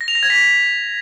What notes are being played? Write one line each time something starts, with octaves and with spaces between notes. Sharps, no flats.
A#6
F7
A#6
G#6
B6